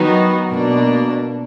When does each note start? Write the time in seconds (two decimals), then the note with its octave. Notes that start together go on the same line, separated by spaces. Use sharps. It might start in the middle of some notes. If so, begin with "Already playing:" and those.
Already playing: D#3 F#3 B3 D#4 F#4
0.49 B2 A#3 D4